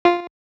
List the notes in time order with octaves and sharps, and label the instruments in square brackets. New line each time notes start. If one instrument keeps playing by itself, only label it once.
[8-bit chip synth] F4